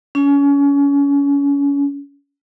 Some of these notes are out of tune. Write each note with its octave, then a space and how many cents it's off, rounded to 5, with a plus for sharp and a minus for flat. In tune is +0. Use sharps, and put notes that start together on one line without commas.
C#4 +30